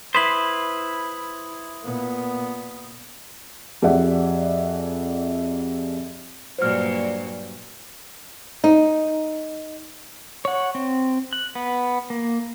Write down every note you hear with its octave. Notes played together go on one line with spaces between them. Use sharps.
E4 B4 C5 D#6 F#7
A#2 B3
F2 G4 G#4 D5 E5 F#5
G2 A#2 F#3 C5 F6
D#4
C#5 F#5
C4
F#6
B3
A#3